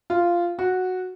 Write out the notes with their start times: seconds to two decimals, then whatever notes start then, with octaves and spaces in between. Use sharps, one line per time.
0.10 F4
0.59 F#4